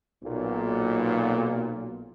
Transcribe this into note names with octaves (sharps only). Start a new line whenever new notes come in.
B1 A#2